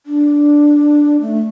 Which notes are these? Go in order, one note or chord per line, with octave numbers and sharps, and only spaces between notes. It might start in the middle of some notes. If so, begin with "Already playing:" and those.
D4
A3